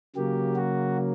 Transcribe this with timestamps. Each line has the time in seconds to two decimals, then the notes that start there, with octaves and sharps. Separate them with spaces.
0.16 C#3 F#3 A#3 G4
0.56 F#4